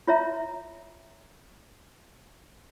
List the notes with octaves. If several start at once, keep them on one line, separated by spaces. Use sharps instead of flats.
F4 C#5 E5 A#5